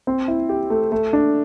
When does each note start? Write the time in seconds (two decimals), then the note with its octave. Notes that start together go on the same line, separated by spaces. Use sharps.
0.07 C4
0.28 E4
0.49 G4
0.70 A3
0.92 A3
1.13 D4